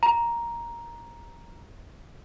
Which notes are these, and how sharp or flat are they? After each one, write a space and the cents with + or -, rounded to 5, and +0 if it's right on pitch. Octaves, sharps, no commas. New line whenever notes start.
A#5 +5